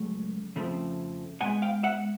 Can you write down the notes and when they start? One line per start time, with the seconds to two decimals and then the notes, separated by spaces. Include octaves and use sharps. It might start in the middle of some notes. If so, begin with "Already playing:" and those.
Already playing: C#2 F#3 A3
0.56 F2 C#3 F3 A3 C4
1.41 A2 F3 G#3 B3 F#5 G#5
1.62 F5 G5
1.83 E5 F#5